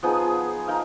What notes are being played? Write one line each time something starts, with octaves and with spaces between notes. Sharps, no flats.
F3 B3 D#4 G#4
D#4 A#4 F5